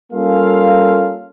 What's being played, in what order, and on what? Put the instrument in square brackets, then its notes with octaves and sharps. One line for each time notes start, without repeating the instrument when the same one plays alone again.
[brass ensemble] G3 A#3 C#4 F4 A4 F5